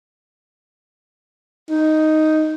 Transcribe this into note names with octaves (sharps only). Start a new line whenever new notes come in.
D#4